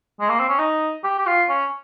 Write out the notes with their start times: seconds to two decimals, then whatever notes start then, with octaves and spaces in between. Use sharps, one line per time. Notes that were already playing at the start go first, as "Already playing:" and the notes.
0.20 G#3
0.29 A#3
0.40 C4
0.49 C#4
0.59 D#4
1.04 G4
1.19 G4
1.27 F4
1.49 C#4